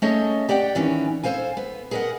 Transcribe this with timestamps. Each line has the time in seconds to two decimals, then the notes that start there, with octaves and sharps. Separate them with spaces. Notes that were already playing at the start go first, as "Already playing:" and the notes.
0.02 A3 C#4 G#4 A4 C#5 D#5
0.49 G4 D5 F#5 G5
0.75 D#3 E3 B3 C#4
1.23 A4 A#4 C5 F5 G#5
1.57 B3
1.91 G#4 A#4 B4 C#5 D#5 F#5